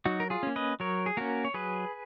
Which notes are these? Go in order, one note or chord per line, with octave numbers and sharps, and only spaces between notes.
F#3 D#4 F#4
A#4
F4 G#4
A#3 C#4
B4 D#5
F#3 A#4 C#5
G#4
A#3 C#4 F#4 A#4
C#5
F#3 G#4 B4